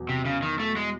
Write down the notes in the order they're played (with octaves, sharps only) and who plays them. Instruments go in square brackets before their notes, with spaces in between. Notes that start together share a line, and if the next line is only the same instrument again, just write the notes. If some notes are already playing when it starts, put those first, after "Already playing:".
Already playing: [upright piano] E2 B2 F#3
[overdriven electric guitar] C3
C#3
D#3
A3
G#3